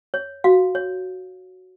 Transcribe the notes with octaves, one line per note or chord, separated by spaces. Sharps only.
C#5
F#4 F5
C#5